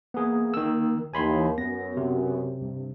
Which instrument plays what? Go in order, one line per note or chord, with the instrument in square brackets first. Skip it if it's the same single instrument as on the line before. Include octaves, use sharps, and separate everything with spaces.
[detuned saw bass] A#3 [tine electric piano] B3 G#4
[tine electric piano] D#3 E6
[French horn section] D#2 [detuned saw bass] E3 [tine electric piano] G#5 B5 C6
[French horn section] F#2 [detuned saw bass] B3 [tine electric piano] A#6
[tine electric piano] C3
[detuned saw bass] G2